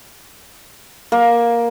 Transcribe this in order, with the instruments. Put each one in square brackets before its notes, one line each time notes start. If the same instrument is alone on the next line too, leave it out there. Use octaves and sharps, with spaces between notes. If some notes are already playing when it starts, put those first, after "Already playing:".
[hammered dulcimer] A#3